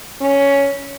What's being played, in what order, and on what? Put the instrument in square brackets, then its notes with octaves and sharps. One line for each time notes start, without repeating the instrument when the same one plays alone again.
[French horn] C#4